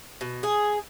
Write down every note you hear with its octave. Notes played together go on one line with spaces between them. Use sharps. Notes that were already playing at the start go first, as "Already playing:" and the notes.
B2
G#4